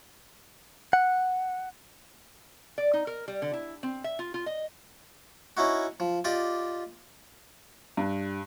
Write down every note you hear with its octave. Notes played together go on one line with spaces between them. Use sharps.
F#5
D5
D#4
A#4
G3
D3
E4
C4
E5
F4
F4
D#5
C#4 D#4 E4 F#4
F3
F4 G4 D5 D#5
G2